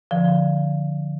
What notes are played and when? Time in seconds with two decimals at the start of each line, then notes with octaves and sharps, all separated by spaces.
0.11 D3 F3